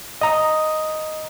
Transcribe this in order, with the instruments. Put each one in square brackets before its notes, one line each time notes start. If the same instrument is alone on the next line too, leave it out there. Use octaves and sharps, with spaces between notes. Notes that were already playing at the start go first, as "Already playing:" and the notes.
[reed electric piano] D#5 A#5 D#6